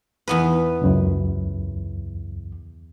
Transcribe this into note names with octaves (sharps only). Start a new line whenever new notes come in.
E2 B3 B4
C#2 F#2